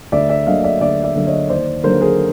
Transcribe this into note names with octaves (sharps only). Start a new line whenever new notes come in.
D2 D5 E5
D5 E5
D3 F#3 A#3 D#5 F5
D5 E5
D2 D5 E5
D5 E5
D3 F#3 A#3
C#5 D#5
D#2 C5 D5
D3 F#3 A#3 A#4 C5
G#4 A#4